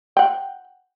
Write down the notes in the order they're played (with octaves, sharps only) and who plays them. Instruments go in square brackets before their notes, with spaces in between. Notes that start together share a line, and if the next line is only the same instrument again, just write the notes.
[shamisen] F#5 G5